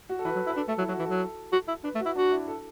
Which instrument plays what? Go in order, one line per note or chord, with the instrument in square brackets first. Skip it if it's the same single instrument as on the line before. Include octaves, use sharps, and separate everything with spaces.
[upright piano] F#4
A4
[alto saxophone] E3 [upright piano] B4
[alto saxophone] F#3
E4
[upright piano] B4
[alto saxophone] D4 [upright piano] A4
[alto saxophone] A3 [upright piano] A4
[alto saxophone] F#3 [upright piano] E4
[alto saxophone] F#3 [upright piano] F#4
[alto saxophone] E3
[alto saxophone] F#3 [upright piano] A4
[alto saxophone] F#4
E4
[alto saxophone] D4 [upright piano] B4
[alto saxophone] A3
[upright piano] F#4
[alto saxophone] E4
[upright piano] D4 [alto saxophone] F#4
[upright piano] E4
A4